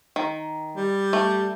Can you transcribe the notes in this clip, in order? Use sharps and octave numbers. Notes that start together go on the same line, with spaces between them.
D#3
G3
A3